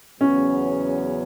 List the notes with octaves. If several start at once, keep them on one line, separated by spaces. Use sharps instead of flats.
E2 C#3 F#3 B3 C#4